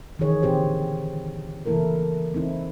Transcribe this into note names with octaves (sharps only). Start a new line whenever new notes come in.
D#3 E3 D#4 G#4 C#5
A#2 D3 C4 G4 C5
C#3 E3 A#3 E4 A4 A#4
C4 D#4 E4